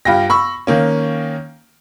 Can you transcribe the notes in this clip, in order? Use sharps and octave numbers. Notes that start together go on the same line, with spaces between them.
G2 F4 G5 A#6
B5 C#6 E6
D#3 A#3 C#4